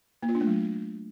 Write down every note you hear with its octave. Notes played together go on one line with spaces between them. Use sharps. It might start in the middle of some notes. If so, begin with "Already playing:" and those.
A#3
F4
D4
A3
F#3